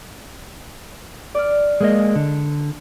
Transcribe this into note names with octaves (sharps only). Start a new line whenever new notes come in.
D5 F6
G#3 A#3 D#5
D3